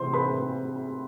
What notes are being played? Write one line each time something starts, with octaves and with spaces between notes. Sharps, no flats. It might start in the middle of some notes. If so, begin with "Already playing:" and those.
Already playing: C3 E3 C5 C6
B4 B5